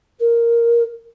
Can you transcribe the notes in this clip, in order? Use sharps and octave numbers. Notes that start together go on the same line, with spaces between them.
A#4